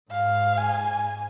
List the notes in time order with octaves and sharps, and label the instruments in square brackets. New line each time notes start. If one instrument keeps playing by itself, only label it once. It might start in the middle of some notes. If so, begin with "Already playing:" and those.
[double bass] G#2 [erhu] F5
[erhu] G#5